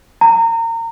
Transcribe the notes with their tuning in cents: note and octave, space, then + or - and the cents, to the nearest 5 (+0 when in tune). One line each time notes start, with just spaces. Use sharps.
A#5 -30